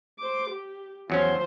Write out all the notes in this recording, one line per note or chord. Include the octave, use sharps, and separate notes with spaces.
C5 D6
G4
E2 F3 F#3 C#4 C5